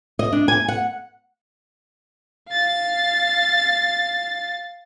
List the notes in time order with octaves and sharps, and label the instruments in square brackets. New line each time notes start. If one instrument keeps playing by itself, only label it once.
[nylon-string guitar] D#5
D4
G#5
F#5
[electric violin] F5 A6